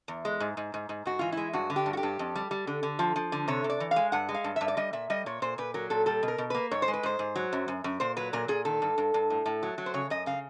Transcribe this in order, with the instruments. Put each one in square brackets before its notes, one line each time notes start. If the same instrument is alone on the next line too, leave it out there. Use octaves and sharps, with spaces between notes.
[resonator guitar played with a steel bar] E2
G#3
G#2
G#2
G#2
G#2
G#2 F#4
E3 F4
G#3 E4
G2 F#4
D3
G4
G2
F#4
G4
G2
F2
G3
G3
D3
D3
F3
F3
D3
C3 C#5
C3
D5
E3
F5
G#3
G2 F#5
G#3
F5
G2
G2 E5
D5
G3 D#5
A#2 E5
G3 D#5
A#2 C#5
A#2 C5
A#2 B4
F#3 A#4
A#2 A4
G3 A4
B2
A#4
B2
A#3 B4
G#2 C#5
C5
G#3
B4
G#2 C5
G#2
F#3
F#2
F#2
F#2
A#2 C5
F#3 B4
A#2 A#4
A#2 G#4
D#3 A4
G2
G2
G2
A2
A2
F#3
F#3
C5
C#3 C#5
F#2 D#5
C#3 F5